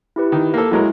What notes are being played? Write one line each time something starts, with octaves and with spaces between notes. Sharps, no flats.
E4 G4 B4
D#3
A#3 A4
F#3 G#3 E4 A#4